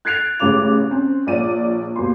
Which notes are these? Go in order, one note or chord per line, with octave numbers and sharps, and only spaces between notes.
F#6 G#6 A6 C7 D7 F7
A1 C#3 C#5 D6 F7
C4 C#4
A#1 C#5 D5 D#7
D#2 B2 C6